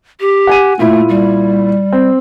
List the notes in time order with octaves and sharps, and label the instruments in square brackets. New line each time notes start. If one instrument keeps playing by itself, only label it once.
[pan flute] G4
[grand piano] F#5 G#5 D#7
[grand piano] A#2 E4 [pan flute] A3
[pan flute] G3
[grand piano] C4